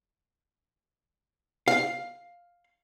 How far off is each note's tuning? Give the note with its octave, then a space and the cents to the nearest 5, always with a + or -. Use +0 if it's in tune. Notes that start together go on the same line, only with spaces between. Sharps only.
F5 +5